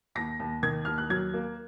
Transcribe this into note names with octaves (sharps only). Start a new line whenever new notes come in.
D#2 A#6
D#2
D#3 G#6
D#2 F6
F#6
F#3 G#6
A#3